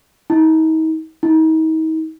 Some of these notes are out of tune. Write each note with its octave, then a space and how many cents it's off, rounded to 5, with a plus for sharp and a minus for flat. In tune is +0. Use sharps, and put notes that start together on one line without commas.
D#4 +40
D#4 +40